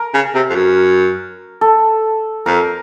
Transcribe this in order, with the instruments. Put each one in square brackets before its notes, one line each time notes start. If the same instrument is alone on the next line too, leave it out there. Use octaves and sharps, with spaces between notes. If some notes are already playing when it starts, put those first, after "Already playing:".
Already playing: [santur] A#4
[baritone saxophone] C#3
C3
F2
F#2
[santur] A4
[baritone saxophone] F2 [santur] A#4